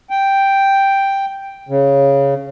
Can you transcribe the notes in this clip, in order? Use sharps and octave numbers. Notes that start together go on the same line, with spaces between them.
G5
C#3